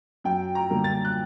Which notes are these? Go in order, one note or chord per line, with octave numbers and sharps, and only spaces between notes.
F#2 G5
A#5
D3 G3 A#3
A6
F#6